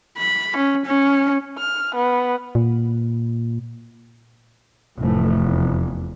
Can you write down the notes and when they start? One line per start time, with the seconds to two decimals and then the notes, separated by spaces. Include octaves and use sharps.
0.18 B5
0.57 C#4
0.86 C#4
1.58 F6
1.96 B3
2.55 A#2
4.99 F1 A2 E3 A3
5.38 E2